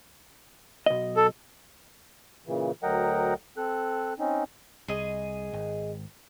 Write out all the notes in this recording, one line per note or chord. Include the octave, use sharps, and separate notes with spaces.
B1 D#5
A4
A#2 C#3 E3
D2 F#3 A#4 D#5 F#5 G5
C4 A4 F#6
C4 C#4 D#4
C2 G#4 D#5
G#1